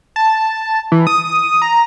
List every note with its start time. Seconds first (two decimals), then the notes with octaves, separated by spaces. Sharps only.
0.16 A5
0.92 E3
1.07 D#6
1.62 A#5